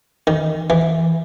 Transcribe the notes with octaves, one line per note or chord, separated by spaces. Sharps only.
D#3
E3